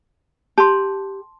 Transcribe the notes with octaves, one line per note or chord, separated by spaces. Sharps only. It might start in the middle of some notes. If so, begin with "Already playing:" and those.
G4 A5 C6